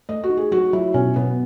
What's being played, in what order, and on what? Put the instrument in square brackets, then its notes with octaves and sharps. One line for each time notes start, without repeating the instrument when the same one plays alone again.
[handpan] A3 [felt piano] D#5
[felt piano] F#4
[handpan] D#4
[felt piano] G#4
[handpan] F#3 [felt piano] F#4
[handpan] F#3 [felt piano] E4
[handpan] B2 [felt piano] C#4
[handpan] B2 [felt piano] B3